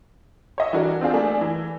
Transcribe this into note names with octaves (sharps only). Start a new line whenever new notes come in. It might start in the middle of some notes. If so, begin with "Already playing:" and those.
C#5 D#5 E5
E3 D4 F#4 A#4
C4 D4 F4 G#4
A3 A#3 D4 G#4
E3